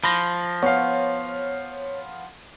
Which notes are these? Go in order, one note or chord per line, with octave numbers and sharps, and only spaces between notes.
F3 B5 A#6
B3 C#5 F5